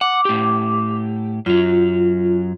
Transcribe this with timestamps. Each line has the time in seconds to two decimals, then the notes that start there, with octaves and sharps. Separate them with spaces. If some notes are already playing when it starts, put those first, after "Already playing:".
0.01 F#5 D6
0.25 A2 G4
1.46 F#2 F#3 F4